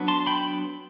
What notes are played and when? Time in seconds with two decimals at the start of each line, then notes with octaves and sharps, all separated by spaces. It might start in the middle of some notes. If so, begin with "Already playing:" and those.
Already playing: F#3 B3 D4
0.08 A5 C6
0.26 G5 B5